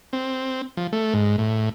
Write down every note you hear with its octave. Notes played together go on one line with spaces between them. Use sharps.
C4
F3
A3
G#2
A2